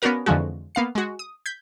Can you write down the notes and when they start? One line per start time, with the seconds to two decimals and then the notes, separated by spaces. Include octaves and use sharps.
0.02 B3 C#4 D4 F#4 A#4 F5
0.26 F2 D3 E3 F3 G#3 F#4
0.75 A#3 B3 F5 C7
0.95 G#3 F#4
1.19 D#6
1.46 G6 G#6 B6